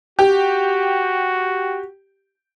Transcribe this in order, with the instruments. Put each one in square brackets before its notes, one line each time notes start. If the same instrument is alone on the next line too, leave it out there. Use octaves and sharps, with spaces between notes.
[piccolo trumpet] F#4 [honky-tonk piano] G4